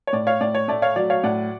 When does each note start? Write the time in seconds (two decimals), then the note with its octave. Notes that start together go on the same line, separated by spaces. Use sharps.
0.07 C#5
0.13 A2 D5
0.27 C#5 F5
0.41 A2 D5
0.55 C#5
0.68 A3 D5
0.82 C#5 F5
0.96 F#3 D5
1.10 C#5 F5
1.24 A2 D5 F#5